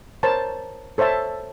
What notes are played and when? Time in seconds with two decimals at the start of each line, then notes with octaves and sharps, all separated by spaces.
0.23 A#4 C5 C#5 A5
0.98 A4 C5 C#5 E5 A5